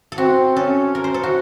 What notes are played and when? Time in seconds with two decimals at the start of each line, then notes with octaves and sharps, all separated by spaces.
0.12 A4
0.18 C4 F#4
0.56 C#4 A4
0.95 A#4
1.04 C5
1.14 A4
1.23 F#4